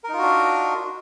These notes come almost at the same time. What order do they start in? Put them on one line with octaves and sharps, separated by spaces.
A#4 D#4 F4 F#4 D4